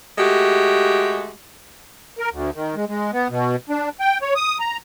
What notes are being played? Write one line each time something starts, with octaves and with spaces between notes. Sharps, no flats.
G#3 A3 F#4 G4
A#4
D2
D#3
G#3
G#3
B3
B2
D4
G5
C#5
D#6
A#5